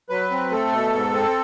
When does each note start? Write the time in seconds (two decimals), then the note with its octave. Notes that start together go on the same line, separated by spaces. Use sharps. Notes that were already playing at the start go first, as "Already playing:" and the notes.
0.09 F#3 B4
0.31 C4
0.52 A3 A4
0.72 B2
0.93 G#2
1.14 C4